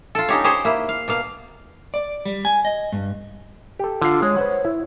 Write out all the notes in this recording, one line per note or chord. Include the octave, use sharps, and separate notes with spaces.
F4 A4
C#4 D#4 G4 C#5
G4 G#4 C5 C#5 D#5
A#3 E4
F5
B2 A#3 F5
D5
G3
G#5
D#5
G2
G4 A4
D3 F4 F5
G#3 C#5
B4 C5 F#5
E4